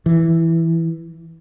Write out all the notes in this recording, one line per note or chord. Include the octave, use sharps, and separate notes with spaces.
E3